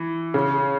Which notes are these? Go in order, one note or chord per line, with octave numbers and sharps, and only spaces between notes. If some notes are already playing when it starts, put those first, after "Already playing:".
Already playing: E3
C#3